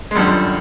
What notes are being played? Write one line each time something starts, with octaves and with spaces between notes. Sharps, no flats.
G#3
G#1 F#2 D3 F3 G3